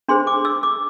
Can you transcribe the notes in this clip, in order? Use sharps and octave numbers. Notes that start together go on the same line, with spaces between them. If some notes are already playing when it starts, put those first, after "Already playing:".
D4 G#4 C5 C6
D6
E6
D6